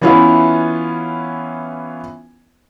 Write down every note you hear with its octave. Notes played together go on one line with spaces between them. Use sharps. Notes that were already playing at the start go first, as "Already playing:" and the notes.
E3 B3 C#4 E4 F4